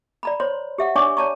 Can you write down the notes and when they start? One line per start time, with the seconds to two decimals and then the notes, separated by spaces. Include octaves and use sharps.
0.23 D5 A#5 B5
0.40 C5 C#5 C6
0.78 G4 E5 F#5
0.96 D4 C#5 D5 G#5 C#6 D6
1.17 C#5 D5 A5 A#5 C#6